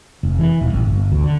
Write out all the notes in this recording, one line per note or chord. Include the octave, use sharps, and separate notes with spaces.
F1
E3
D#1
A1
G1
D2
D3